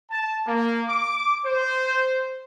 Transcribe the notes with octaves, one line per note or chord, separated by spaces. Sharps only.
A5
A#3
D6
C5